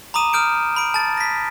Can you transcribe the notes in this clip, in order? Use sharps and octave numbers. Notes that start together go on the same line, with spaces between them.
A#5 B5 D6 D#6 D#7 E7
D#6 F6 G6 D7
B5 D7
A5 A6
A#6 B6